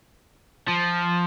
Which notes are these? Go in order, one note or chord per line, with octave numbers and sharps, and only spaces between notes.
F3